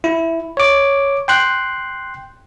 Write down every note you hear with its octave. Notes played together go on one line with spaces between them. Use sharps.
E4
C#5 D6
G5 C6 F#6